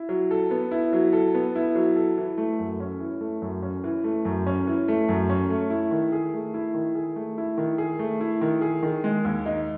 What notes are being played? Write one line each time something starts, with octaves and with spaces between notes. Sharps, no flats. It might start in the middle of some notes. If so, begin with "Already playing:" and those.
Already playing: E4
F#3
A4
B3
E4
F#3
A4
B3
E4
F#3
A4
E3
A3
F#2
C#4
E3
A3
F#2
C#4
E3
A3
F#2
C#4
E3
A3
F#2
C#4
A3
E4
D#3
G#4
A3
E4
D#3
G#4
A3
E4
D#3
G#4
A3
E4
D#3
G#4
D#3
G#3
D#2
D#4